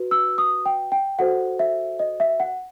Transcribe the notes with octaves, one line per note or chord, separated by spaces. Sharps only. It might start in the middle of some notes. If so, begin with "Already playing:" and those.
Already playing: F#4 B4
E6
D#6
G5
G5
F#4 A4 C5 F#5
E5
D#5
E5
F#5